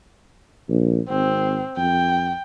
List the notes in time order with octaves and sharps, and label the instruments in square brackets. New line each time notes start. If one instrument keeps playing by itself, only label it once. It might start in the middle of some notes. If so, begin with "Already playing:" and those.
[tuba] A#1
[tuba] G#1 [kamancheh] C4
[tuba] F2 [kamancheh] G5